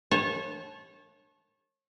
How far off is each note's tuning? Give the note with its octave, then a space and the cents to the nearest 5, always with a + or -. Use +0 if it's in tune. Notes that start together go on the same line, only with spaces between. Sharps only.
C#5 -30 A5 -20